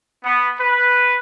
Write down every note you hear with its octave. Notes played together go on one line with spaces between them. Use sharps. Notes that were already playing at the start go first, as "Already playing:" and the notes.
B3
B4